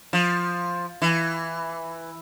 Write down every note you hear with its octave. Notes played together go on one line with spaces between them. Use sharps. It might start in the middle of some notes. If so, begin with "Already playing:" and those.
F3
E3